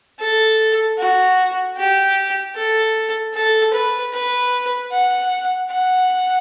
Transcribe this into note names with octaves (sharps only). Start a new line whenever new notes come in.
A4
F#4
G4
A4
A4
B4
B4
F#5
F#5